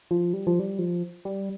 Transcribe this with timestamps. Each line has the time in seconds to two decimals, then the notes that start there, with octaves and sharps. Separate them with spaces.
0.11 F3
0.33 G3
0.47 F3
0.59 G3
0.79 F3
1.25 G3